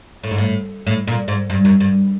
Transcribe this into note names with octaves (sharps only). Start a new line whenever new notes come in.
A2
G#2
A2
A2
A#2
G#2
G2
F#2
G2